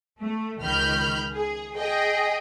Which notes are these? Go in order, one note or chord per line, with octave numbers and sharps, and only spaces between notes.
A3
C#2 D#3 B5 F6 G6
G#4
G#4 D#5 G5